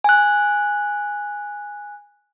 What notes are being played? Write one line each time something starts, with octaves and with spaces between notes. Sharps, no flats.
G#5 F#6